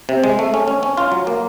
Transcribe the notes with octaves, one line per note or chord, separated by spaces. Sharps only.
C3
G#3
A3
C#4
C#4
C#4
F4
F#3
A#3